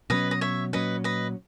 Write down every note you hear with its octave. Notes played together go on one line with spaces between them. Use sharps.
B2 F#3 C#4 B4 D#5
D#5
C#5 E5
A#2 F#3 C#4 B4 D#5
B4 D#5